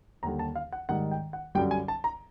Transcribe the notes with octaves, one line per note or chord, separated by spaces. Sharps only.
D#2 D3 G3 A#5
A5
F5
F#5
G#2 D#3 G3 F#5
G5
F#5
F#2 D3 G3 G5
G#5
A5
A#5